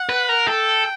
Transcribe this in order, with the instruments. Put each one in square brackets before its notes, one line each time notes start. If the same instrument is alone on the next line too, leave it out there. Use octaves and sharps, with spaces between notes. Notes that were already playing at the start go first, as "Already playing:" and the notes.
Already playing: [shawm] F#5
[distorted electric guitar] B4
A#4
[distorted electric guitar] A4 [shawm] G5